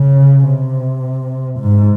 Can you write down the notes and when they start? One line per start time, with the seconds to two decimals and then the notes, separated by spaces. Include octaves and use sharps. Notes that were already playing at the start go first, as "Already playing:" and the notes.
Already playing: C#3
0.47 C3
1.60 G#2